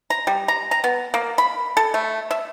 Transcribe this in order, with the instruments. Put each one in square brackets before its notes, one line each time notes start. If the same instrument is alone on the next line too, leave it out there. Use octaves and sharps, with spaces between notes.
[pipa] A#5
G3
A#5
A#5
B3
A#3
B5
A4
A3
E5